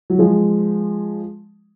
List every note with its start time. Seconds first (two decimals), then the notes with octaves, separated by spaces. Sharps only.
0.10 F#3
0.19 F3 G#3